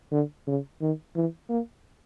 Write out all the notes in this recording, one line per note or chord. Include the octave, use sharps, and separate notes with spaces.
D3
C#3
D#3
E3
A#3